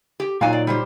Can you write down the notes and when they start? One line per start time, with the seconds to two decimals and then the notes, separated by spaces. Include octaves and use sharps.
0.20 G4
0.41 A#2 F#3 D#4 F5 G#5
0.53 D5
0.67 G3 G4 C5